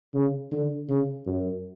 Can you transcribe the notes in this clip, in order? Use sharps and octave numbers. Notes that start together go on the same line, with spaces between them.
C#3
D3
C#3
F#2